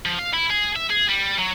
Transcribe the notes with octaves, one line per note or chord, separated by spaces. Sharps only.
F3
F5
E4
G#4
E5
G#4
G3
F#3